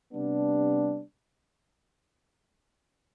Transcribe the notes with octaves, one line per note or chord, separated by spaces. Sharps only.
C3 G3 B3 D4